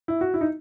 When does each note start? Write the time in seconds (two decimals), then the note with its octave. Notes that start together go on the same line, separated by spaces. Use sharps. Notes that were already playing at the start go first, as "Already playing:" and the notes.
0.08 E4
0.21 F#4
0.34 E4
0.41 D#4